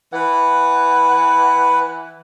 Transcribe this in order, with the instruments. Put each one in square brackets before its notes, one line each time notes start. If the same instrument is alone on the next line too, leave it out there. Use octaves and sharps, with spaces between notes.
[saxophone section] E3 F#5 [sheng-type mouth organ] B4